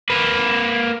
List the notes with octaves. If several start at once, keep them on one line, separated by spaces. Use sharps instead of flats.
A#3 B4